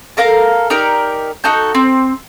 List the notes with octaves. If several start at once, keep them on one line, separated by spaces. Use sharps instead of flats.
A4 A#4 F5 A#5
D#4 G4 A#4 D5
D#4 F#4 A4 G6
C4